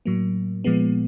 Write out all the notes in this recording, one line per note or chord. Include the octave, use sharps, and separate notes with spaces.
A2 F#3 A#3
A#2 F3 G#3 B3